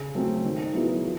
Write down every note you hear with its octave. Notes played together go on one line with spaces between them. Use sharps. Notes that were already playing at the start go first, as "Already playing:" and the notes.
Already playing: C#3
F#3 A3 C4
D#3
F#3 B3 E4 G#4
F3